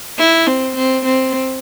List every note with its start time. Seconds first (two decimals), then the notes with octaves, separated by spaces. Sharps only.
0.18 E4
0.47 C4
0.76 C4
1.05 C4